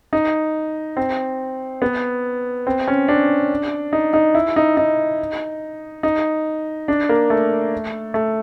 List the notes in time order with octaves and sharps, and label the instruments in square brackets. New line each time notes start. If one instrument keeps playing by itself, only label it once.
[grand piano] D#4
C4
B3
C4
C#4
D4
D#4
D#4
E4
D#4
D#4
D#4
D4
A#3
A3
A3